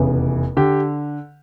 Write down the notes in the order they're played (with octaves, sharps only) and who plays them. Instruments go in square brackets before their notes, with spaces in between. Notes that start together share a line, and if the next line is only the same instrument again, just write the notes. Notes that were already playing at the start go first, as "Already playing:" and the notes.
Already playing: [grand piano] F1 E2 C#3 E3
D3 G4